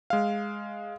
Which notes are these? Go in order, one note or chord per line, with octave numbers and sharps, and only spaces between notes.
G#3 F5